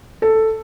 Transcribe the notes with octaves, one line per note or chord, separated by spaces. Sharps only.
A4